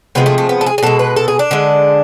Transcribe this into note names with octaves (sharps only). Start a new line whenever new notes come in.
C3 F3 G#3 B3
A3
A3
B3
A4
G#4
G#4
B2 G#3 A4
B4
A4
G#4
D4
D3 G#3